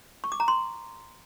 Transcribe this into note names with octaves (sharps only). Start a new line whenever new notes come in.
C#6
D6
A#5
C6